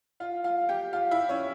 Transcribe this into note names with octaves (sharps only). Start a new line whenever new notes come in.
F4 F5
F4 F5
G4 G5
F4 F5
E4 E5
C#4 C#5